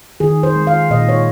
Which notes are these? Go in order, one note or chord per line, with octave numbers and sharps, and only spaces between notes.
D#3 G#4
C5
G#3
F5
A#2 D#5
C#5